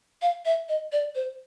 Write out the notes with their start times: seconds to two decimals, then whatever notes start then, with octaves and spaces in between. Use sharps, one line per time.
0.22 F5
0.45 E5
0.69 D#5
0.92 D5
1.15 C5